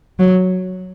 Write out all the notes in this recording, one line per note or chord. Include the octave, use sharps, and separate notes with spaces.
F#3